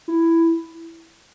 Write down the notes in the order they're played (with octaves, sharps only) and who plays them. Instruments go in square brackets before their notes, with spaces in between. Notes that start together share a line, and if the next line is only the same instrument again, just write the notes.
[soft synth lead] E4